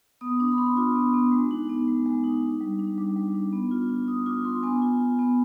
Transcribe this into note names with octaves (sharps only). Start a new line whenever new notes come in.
B3 D#6
D4 D6
B5
D4 C6
F4 D6
B3
B3
G#3
D#4
B3
G#3
G#3
D#4
D4
G3
D4
G3 D6
G3
D4
B3
F4
F4
F4 D#6
F4 D6
F4 C6
B3 G#5
F4
F4
B3